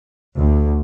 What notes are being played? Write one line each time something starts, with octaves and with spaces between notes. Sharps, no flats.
D2